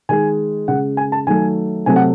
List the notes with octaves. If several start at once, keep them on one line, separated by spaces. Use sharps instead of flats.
D#3 G#3 G#5
C#3 G#3 F#5
G#5
A5
D#3 F#3 A3 G#5
C3 F#3 A3 G#5
F#5